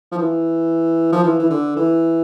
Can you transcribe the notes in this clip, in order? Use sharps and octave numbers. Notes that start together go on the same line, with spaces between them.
F3
E3
F3
E3
E3
D3
E3